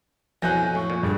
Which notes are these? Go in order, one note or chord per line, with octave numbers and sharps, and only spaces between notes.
F2 B2 E3 F#3 G#5 F#6 G6 A#6
A2 C#6
A#2
G2 G#4